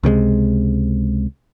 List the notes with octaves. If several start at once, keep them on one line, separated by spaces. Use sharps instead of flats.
C#2 C3 G3 G#3